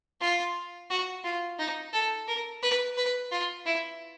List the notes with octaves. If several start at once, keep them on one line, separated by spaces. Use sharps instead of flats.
F4
F#4
F4
D#4
A4
A#4
B4
B4
F4
E4